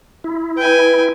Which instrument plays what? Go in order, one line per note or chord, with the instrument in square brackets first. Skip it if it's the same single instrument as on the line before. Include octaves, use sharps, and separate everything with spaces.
[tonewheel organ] E4
[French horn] B4 [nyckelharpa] G5 G#5